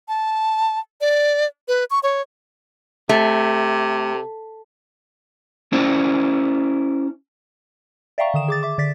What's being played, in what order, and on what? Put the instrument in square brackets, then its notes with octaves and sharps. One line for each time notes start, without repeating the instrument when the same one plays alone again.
[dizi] A5
D5
B4
C#6
C#5
[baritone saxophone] C3 [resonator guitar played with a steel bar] A3
[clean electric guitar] C#4 E4 C5 D5
[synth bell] D5 E5 F5 G5 A#5 C#6
D3 D#3 D#6 E7
G#4 D6 A6
E5 D6
D3 D5 A6 B6